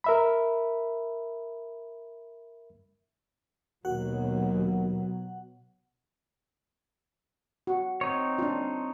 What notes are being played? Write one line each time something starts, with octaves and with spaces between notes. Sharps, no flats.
A#4 E5 B5
D#2 B2 F#3 F#4 F#5
F#4
C4 D#4 C#5
D4 F4